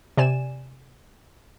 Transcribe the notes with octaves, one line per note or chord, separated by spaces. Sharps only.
C3 D5 G#5 E7